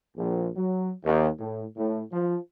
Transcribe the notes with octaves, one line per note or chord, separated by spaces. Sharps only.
A#1
F#3
D#2
A2
A2
F3